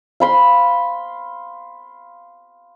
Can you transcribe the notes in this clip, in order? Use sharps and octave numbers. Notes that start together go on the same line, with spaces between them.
F5 B5 C6